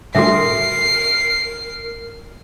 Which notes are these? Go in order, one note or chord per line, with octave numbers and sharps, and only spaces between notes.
A2 D3 G3 F#4 A4 A#4 E5 C7